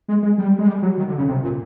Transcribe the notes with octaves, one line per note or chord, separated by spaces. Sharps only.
G#3
G#3
G3
G#3
G3
F#3
D#3
D3
C#3
C3
A#2